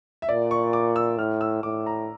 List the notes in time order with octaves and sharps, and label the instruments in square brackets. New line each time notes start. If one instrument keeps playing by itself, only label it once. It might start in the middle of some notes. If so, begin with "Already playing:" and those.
[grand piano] E5
[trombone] A#2 [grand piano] D5
[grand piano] C#6
D6
E6
[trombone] A2 [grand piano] F6
[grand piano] E6
[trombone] A2 [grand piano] D6
[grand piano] A#5